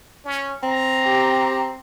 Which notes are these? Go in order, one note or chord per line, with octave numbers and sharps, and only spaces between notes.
C#4
C4 A#5
G4